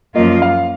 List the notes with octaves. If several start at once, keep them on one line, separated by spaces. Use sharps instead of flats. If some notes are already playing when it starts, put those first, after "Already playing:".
F#2 F3 A#3 F4 D#5
F5